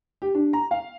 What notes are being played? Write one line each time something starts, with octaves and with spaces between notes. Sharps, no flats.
G4
D4
A#5
F5